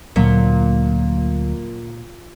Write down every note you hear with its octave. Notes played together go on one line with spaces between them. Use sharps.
D2 A#2 F#3